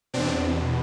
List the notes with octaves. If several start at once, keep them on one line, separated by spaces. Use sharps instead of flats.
E2 B2 C4 D4